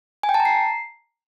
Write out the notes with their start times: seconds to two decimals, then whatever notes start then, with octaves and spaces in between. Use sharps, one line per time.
0.23 G#5
0.29 G5
0.34 A5
0.40 A#5
0.45 C7